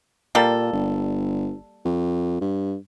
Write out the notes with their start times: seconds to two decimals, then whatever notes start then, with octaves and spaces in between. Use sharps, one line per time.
0.35 A#2 G3 A#3 A4
0.73 G1
1.85 F2
2.41 G2